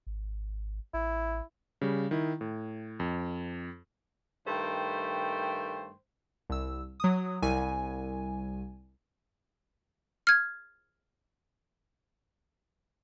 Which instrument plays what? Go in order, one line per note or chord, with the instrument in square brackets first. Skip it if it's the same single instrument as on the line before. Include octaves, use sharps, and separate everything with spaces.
[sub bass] G#1
[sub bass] A1 [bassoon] E4
[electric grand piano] C#3 G3
D#3 E4
A2
F2
[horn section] G2 D#3 A3 C5 G5
[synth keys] C2 E6
F#3 D#6
C2 G#5
[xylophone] F6 G#6